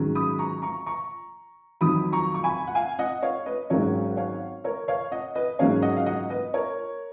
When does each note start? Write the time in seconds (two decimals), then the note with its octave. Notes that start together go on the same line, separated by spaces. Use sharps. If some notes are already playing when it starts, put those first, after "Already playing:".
Already playing: G#2 D#3 F#3 C#4
0.15 B5 D#6
0.39 A#5 C#6
0.62 A#5 C#6
0.86 A#5 C#6
1.81 F2 D#3 F#3 B5 D#6
2.13 A#5 C#6
2.34 C#6
2.44 G#5 B5
2.67 F#5
2.75 F5 G#5
2.99 D#5 F#5
3.23 C#5 F5
3.46 B4 D#5
3.70 G#1 G#2 F#3 C#4 A#4 C#5
4.17 C#5 F5
4.64 A#4 C#5
4.88 C#5 F5
5.12 D#5 F#5
5.35 B4 D#5
5.59 G#2 F#3 A#3 C#4 C#5 F5
5.82 D#5 F#5
5.97 F5
6.06 D#5 F#5
6.30 B4 D#5
6.54 A#4 C#5